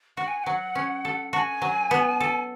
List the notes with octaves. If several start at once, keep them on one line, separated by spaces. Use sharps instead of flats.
F#4 F#5
G#5
G#5
F#3 F#5
C#4
A4
F#4 A5
G#5
F#3
B3
A4